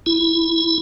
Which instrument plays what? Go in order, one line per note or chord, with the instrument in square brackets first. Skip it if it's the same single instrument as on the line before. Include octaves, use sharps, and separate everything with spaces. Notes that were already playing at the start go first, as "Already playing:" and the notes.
[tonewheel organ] E4